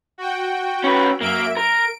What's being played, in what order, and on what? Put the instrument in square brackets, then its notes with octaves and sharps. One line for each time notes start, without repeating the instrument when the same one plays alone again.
[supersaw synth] F#4 G5
[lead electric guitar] C#4 B4
[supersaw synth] F#2 E5 D7 [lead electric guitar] A#3
[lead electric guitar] A#4 [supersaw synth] D7